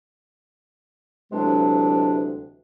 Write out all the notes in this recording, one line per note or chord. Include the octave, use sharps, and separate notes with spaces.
D2 C3 E3 F#3 G#3 D4